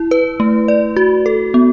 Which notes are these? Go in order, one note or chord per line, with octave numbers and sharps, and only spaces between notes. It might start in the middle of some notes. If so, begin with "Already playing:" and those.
Already playing: E4
B4
A3
D5
F#4
A4
B3